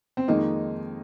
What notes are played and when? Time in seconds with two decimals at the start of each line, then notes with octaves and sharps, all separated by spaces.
0.17 C4
0.28 F2 D#3 G#3 A#3 D#4